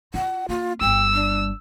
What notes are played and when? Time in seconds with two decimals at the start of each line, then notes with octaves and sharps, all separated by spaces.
0.14 F4 F#5
0.49 A#3 F4
0.81 G1 G3 G5 E6
1.13 D4